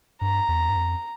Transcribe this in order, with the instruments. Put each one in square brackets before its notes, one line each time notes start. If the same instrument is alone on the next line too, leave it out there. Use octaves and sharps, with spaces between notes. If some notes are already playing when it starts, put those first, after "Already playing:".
[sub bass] G2 [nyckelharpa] A#5
[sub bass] E2
G2
F2